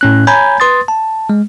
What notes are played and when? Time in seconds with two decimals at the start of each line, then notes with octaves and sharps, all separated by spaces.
0.01 A2 C#4 F#6
0.27 C#5 G#5 A#5 B5 G6 G#6
0.60 B4 C6 D#6 A6
0.88 A5
1.30 G#3